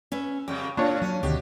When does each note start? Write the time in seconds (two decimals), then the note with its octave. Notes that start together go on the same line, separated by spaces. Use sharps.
0.12 C#4 B4 E5
0.48 F2 C#3 G3 G5
0.77 A2 A#3 D4 C#5
1.01 F#3 C#4
1.23 D2 B2 D3 D#3 G4